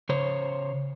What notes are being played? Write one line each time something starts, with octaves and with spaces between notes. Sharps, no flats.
C#3 C5 C#5